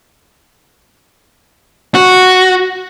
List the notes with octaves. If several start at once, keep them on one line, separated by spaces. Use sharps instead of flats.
F#4